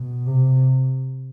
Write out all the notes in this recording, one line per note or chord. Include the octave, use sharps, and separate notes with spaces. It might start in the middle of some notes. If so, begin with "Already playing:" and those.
Already playing: B2
C3